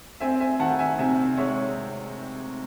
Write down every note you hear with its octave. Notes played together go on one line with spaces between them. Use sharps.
C4 E5 G#5
E5 G#5
D#3 F#5 A5
E5 G#5
C3 E5 G#5
G#3 C#5 E5